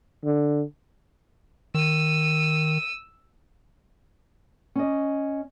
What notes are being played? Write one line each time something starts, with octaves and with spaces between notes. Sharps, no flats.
D3
D#3 E6 D#7
C#4 D#5